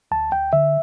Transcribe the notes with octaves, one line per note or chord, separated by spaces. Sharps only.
D2 A5
D2 G5
D3 E5